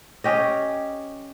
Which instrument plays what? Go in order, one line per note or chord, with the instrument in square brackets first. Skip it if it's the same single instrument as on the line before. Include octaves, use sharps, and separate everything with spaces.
[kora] C#4 G4 D#5